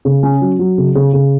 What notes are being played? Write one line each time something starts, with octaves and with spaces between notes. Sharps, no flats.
C#3
C#4
F#3
F#3
C#3
C#3
C#3